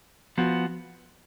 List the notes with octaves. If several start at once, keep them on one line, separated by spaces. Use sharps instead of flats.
F3 B3 F#4